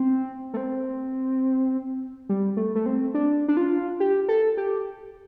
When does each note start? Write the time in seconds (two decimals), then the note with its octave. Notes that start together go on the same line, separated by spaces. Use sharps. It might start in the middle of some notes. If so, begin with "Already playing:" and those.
Already playing: C4
0.54 A3
0.57 C4
2.29 G3
2.57 A3
2.75 A3
2.86 C4
3.14 D4
3.48 D4
3.57 F4
4.00 G4
4.28 A4
4.57 G4